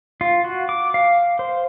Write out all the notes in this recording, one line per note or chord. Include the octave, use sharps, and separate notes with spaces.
F4
F#4
D6
F5
C5